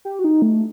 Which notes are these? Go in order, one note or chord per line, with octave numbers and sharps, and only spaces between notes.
G4
F#4
D#4
A3